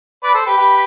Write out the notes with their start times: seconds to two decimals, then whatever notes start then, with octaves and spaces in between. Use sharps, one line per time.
0.23 B4 D5
0.34 A4 C5
0.46 G4 B4
0.57 G4 B4